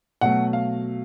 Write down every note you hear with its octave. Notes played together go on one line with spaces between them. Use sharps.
B2 F#3 A3 F#5
F5